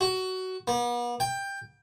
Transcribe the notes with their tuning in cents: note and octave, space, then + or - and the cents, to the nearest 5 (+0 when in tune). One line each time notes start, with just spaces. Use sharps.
F#4 +15
B3 -40
G5 +15